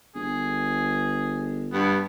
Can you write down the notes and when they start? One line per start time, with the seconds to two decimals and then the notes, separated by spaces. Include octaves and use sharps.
0.15 G1 G#4
1.72 G2 B3